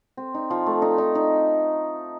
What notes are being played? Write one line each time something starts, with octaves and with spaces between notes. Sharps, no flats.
C4
D#4
F3
A3
D#4
D#4
D#4